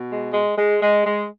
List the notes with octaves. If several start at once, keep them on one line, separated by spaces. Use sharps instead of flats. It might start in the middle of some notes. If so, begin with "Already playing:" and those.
Already playing: B2
G#3
G#3
G#3
G#3
G#3